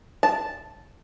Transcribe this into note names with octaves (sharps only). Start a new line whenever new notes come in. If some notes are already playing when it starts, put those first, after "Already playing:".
A5